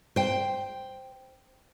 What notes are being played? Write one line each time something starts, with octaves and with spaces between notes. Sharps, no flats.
C5 G5